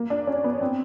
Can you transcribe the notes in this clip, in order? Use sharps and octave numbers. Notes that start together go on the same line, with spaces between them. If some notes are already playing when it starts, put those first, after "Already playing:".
Already playing: A#3
D4
C#4
B3
C4